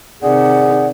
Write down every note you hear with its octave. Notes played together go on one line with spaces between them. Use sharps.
C3 D#3 G#4 D5 F#5